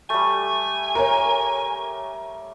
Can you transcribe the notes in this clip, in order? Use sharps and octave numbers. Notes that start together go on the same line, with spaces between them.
G3 A3 G#5
A#4 C#5